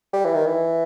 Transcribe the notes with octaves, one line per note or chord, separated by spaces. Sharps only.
G3
E3
D#3
E3